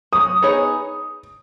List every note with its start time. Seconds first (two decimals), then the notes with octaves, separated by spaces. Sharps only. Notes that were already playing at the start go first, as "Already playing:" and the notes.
0.13 F#3 D#6
0.42 B3 D#4 G#4 C#5